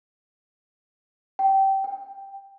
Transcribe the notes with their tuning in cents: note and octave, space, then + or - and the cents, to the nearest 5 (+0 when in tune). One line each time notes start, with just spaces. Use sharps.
G5 -20
G5 +5